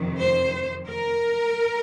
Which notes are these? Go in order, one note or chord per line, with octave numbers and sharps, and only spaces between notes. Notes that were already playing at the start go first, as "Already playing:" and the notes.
Already playing: F2 C3 D#3
C5
A#4